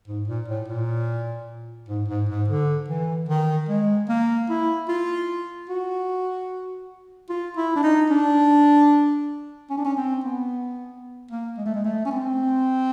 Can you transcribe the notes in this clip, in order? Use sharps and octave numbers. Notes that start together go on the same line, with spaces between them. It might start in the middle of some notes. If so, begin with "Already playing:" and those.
G#2
A#2
A2
A#2
G#2
G#2
G#2
D3
E3
D#3
G#3
A#3
E4
F4
F#4
F4
E4
D4
D#4
D4
C#4
D4
C#4
C4
B3
A#3
G#3
A3
G#3
A3
C#4
C4